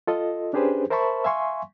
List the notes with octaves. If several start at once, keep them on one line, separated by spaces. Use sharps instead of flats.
F4 A4 D#5
C#4 D4 G4 G#4 B4 C5
A#4 C5 E5 A5 B5 C#6
E5 F5 G#5 C6 C#6